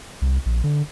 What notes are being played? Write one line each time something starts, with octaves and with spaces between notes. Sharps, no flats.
C2
A#1
D3